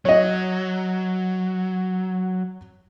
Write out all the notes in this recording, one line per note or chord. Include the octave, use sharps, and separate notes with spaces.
F#3 C#5 D#5